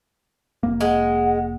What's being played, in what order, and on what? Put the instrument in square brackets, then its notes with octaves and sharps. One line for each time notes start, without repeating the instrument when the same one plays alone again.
[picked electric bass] F1 A#3
[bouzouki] G#3 [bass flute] F#5